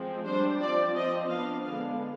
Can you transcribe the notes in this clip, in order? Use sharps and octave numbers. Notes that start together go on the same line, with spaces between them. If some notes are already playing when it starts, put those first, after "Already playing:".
Already playing: F3 G#3 C4
G3 D4 C5
F3 C4 D5
F3 C4 D#5
F3 B3 D4 F5
D3 G#3 B3 D4 F5